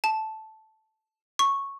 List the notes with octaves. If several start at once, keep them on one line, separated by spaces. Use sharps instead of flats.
A5
C#6